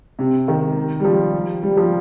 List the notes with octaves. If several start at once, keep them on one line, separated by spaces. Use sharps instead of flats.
C3
D#3
G3
F3
G3
F3